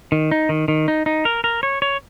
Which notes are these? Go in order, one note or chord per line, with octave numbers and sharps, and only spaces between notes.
D#3
D#4
D#3
D#3
D#4
D#4
A#4
A#4
C#5
C#5